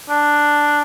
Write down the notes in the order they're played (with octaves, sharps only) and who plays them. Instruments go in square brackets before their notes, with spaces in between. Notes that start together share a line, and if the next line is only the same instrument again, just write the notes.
[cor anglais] D4